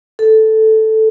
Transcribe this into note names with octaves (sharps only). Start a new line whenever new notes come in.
A4